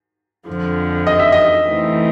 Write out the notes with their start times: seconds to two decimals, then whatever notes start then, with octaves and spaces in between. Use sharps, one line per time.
0.47 F2 D3 F3
1.07 D#5
1.19 E5
1.32 D#5
1.67 E3 A3 C4 D#4